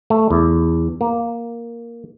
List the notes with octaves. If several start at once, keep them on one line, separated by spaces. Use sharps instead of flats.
A3
E2
A#3